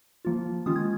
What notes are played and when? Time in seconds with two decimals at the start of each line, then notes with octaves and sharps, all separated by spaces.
0.25 F3 A#3 F4
0.66 D#3 G#3 C#4 F4 D#6
0.76 G#6